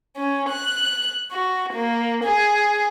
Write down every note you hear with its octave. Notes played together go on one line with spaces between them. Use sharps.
C#4
F#6
F#4
A#3
G#4